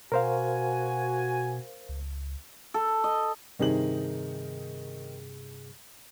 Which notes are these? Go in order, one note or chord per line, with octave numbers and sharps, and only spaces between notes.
B2 F#4 A#4 C5 F5 G#5
C#2
A4
D#5
G2 C3 D#3 D#4 G#4 F#7